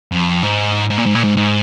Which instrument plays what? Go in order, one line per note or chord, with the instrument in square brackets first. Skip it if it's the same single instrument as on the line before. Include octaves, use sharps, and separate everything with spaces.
[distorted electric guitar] F2
G#2
G#2
A#2
G#2
A#2
G#2
G#2